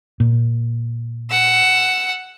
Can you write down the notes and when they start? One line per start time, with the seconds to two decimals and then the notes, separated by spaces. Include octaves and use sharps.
0.20 A#2
1.30 F#5 E6